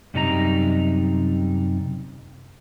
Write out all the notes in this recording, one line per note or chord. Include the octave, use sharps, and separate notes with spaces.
F#2 C3 G3 D#4 F4 A#5